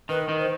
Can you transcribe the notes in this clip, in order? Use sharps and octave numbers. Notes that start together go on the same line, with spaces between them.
D#3 B4
D#3
C5